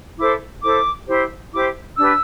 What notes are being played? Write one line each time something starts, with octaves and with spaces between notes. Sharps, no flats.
E4 A4 C5 D6
E4 A4 C5 D6
E4 G4 C5
E4 G4 C5 D6
D4 G4 B4 E6